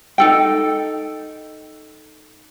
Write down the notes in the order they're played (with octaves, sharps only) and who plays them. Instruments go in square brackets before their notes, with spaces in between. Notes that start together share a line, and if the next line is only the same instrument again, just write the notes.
[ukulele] D#4 A4 G5